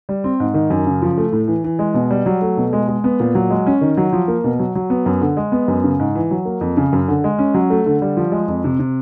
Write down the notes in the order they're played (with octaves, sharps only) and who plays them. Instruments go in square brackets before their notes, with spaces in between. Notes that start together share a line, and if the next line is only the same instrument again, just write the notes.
[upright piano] G3
C4
G#2
D#3
F#2
C#3
F3
A3
A2
E3
E3
G#3
B2
G3
F#3
A3
B2
G#3
G#3
B3
A#2
F#3
G#3
C#4
D#3
F#3
F3
A#3
B2
F#3
F#3
B3
F#2
D3
G#3
B3
F#2
C#3
G#2
E3
F#3
A#3
F2
C#3
F#2
D3
G#3
C#4
F#3
A3
D3
G3
F3
G#3
F2
C3
C3